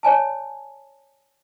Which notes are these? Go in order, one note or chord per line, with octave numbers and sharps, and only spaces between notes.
C#5 D5 G#5 A5